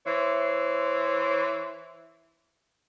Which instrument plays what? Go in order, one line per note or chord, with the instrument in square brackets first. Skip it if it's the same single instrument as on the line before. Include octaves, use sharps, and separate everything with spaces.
[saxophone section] E3 C5 C#5 E5